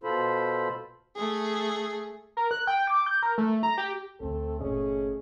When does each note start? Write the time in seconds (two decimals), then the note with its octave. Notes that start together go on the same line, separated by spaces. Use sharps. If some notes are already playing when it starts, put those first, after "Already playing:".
0.03 B2 F4 A4 C5 B5
1.16 A3 G#4
2.37 A#4
2.51 F#6
2.67 G5
2.87 D6
3.06 G6
3.23 A#4
3.38 A3
3.63 A#5
3.78 G4
4.20 A1 D2 A3 C4 A4
4.61 G1 A#2 A3 C#4 G#4 D#5